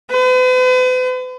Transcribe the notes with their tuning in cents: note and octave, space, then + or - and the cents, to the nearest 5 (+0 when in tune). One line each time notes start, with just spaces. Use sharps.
B4 +45